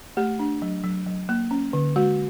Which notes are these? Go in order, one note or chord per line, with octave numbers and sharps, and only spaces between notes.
A3 G4
D4
F#3
F#3
F#3
A#3
C#4
D3
G#3 F#4